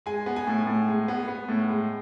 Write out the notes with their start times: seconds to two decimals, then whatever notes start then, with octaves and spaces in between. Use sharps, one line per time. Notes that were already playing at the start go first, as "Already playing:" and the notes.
0.06 G#3 G#5
0.26 B3
0.36 G#5
0.47 A2
0.67 A2
0.88 G#3
1.08 B3
1.28 B3
1.48 A2
1.69 G#3